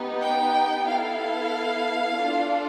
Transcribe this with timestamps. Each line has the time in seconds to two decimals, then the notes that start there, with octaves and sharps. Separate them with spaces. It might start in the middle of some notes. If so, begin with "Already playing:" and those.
Already playing: B3 D#4 G4
0.22 G5
0.87 B3 E4 A4 F5
2.17 D4 F4 A4